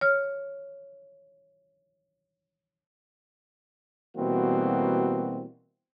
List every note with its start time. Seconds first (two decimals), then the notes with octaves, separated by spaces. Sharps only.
0.01 C#5 F6
4.16 B2 E3 G3 A#3 C4 F#4